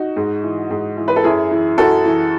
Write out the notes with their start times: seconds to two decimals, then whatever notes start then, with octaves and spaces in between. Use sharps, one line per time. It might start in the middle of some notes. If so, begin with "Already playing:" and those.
Already playing: D#4 F#4
0.16 G#2
0.43 E3
0.70 G#2
0.97 E3
1.08 B4
1.16 A4
1.24 F#2 E4 G#4
1.51 E3
1.78 F#2 F#4 A4
2.05 E3